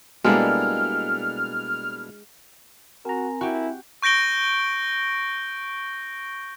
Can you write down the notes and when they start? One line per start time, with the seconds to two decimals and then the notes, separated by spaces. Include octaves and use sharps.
0.25 B2 G3 G#3 A#3 D4 E4 A4 F6
3.05 C4 F#4 A#4 G#5 A#5
3.41 E4 F#4 G4
4.02 C#6 G6 A#6 D7 G7